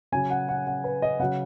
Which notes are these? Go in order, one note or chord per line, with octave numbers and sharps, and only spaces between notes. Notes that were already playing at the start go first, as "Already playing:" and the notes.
C#3 F#3 G#5
F#5
F#5
F#5
B4
D#5
C#3 F#3 F#5